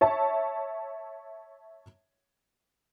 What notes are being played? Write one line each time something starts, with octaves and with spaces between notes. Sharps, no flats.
C#5 E5 A5